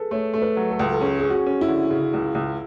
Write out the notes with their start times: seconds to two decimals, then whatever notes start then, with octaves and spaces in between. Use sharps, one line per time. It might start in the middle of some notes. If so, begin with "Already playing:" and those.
Already playing: G#4 A4 B4
0.11 A3 C#5
0.33 A3
0.42 B4
0.57 F#3
0.71 A4
0.79 C#2
0.93 A4
1.01 C#4 G#4
1.19 C#4 G#4
1.30 F#4
1.46 C#4
1.61 E4
1.68 D3
1.90 C#3
2.13 C#2
2.35 C#2